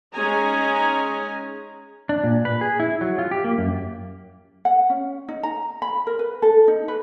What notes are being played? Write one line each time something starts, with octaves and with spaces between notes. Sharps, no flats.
G#3 C#4 D#4 G#4 G#5 A#5
D4
A#2
B4
G#4
E4
F#3
F4
G4
A#3
F#2
F#5
C#4
D#4
A#5
B5
A#4
B4
A4
D#4
B4